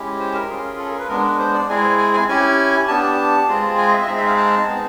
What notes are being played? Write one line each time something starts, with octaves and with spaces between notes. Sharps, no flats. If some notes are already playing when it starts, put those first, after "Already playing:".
Already playing: G#3 C#4 E4 G4
C5
A#4
C#4 F4 G#4
A4
A#4
B4
G#3 B3 D4 A#4
B4
C5
D5
G#3 C4 E4 G#4 G#5
G#5
G#5
C#4 E4 G4 G#5
B3 D4 G4 A5
A5
G#3 C4 F4 G#4
G#5
D#5
E5
D#5
G#3 C4 D#4 G#4 E5
E5
F5
A5
G#3 B3 D#4 G#4